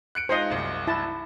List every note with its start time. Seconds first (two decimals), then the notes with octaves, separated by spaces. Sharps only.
0.15 F#6 C#7 D7
0.29 G#3 D#4 F4 C5 D#5
0.50 C2 F#2
0.87 E4 A5